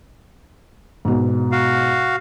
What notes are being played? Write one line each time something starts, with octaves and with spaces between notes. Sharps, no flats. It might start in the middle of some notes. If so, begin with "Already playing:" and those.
G#2 B2
F#4 F5